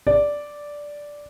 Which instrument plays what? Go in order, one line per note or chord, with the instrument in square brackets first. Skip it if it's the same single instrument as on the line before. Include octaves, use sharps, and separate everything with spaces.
[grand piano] D5